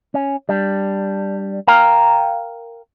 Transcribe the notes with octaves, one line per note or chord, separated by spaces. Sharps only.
C#4
G3 D4
A#4 F5 G5 A#5